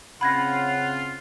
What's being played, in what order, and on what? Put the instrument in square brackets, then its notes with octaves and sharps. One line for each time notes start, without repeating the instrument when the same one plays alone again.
[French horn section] C#3 C4 C#4 [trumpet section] F4 [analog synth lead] F#5 [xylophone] B5 G#6 A#6